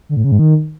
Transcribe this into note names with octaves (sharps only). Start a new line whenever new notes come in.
D3
A2
C#3
G#2
D#3